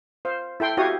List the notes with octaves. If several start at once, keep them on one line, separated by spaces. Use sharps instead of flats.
C5 F5
E4 A4 G5 C6
E4 F#4 G4 C#5 F5 D#6